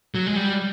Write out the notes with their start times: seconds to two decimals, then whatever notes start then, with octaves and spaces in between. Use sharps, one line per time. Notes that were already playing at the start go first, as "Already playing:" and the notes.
0.15 F#3
0.27 G#3
0.36 G3